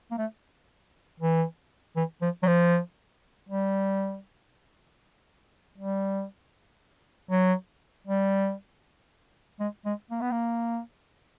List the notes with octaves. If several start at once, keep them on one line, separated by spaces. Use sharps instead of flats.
A#3
A3
E3
E3
F3
F#3
F3
G3
G3
F#3
G3
G#3
G#3
A#3
B3
A#3